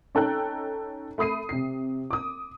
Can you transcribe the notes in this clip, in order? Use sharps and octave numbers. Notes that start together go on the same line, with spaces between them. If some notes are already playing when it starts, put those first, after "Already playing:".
C#4 D#4 A4 G5 A#5 F#6
A3 B5 D#6 C7 D#7
C3 C7
D6 D#6